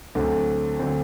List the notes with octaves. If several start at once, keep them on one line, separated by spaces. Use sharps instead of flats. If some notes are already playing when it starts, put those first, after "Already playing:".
D2 D3 F#3 A3 C4
D3 F#3 A3 C4